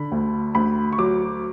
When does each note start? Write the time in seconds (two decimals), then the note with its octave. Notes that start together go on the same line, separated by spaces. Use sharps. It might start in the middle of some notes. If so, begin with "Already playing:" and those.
Already playing: D3 B5
0.12 D2
0.55 D2 B5
0.93 C#6
0.98 F#3 D6